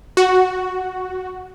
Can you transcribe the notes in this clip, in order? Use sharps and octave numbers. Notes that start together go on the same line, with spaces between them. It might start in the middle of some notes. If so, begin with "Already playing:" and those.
F#4